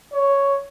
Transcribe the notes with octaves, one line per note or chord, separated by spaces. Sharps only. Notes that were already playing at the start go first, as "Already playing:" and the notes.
C#5